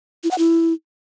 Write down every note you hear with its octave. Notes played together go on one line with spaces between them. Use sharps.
E4
F#5
E4